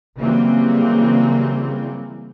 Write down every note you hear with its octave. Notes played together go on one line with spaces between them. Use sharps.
C#3 E3 F#3 G3 A#3 C4